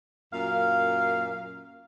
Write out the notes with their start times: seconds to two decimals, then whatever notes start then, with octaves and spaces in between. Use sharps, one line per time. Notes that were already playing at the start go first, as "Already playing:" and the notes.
0.33 F#2 A#2 F5